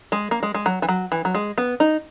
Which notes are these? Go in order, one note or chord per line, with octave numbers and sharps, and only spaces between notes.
G#3
A#3
G#3
G#3
F#3
E3
F#3
E3
F#3
G#3
B3
D#4